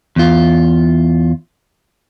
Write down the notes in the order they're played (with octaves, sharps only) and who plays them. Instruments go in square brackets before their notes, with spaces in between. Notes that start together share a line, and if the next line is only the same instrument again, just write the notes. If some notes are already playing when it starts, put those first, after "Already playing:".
[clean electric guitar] E2 F4